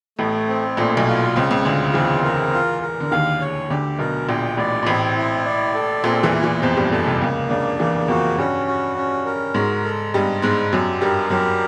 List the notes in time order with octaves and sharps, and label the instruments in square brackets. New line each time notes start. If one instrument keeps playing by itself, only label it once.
[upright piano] A1 A2 [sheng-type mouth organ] A3
[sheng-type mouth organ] C4
[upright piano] A#1 A#2 [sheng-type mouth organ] A3
[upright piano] B1 B2
[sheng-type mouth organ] F4
[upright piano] C#2 C#3 [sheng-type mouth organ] C4
[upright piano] C#2 C#3
[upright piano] D2 D3 [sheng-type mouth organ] F4
[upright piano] E2 E3 [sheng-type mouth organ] C4
[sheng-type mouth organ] A#4
F4
A#4
[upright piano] D3
[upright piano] D#2 D#3 [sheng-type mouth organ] F5
[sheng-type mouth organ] C#5
[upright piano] D2 D3 [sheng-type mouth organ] G4
[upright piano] B1 B2 [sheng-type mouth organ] A#4
[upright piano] A#1 A#2 [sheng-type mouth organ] G5
[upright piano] A1 A2 [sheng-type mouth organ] D5
[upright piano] A#2
[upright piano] A1 A2 [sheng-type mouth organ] C4
[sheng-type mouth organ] E4
D5
A4
[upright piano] A#1 A#2 [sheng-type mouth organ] C4
[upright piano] E2 E3
[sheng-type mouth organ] E4
[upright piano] E2 E3
[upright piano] F2 F3 [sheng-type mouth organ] C5
[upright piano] G2 G3
[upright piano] F#2 F#3 [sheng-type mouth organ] A4
[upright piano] C2 C3
[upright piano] C#2 C#3 [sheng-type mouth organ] A#3
[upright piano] C#2 C#3 [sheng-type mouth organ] D4
[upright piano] E2 E3 [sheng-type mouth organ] A#3
[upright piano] F2 F3 [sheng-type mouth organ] F#4
[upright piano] G2 G3 [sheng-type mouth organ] C#4
[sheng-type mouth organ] F#4
C#4
A#4
[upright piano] G#2 G#3 [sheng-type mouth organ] F#4
[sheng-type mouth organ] A4
[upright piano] G2 G3 [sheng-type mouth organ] D#5
[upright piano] G#2 G#3 [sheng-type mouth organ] C5
[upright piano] F#2 F#3 [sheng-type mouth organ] G4
[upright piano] G2 G3 [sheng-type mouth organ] A#4
[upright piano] F#2 F#3 [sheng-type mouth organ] G4